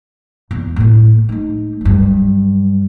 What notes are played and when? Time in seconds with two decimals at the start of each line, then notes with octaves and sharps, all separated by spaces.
0.51 E2
0.76 A2 A3
1.29 A3 D#4
1.81 G2 F#3